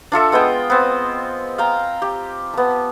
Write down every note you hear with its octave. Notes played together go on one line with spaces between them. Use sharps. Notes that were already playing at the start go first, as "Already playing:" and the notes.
D4 F4 A4 E5
G#3 B3 D#5 G5
B3 C4
F5 G5 A#5
G4
B3 A5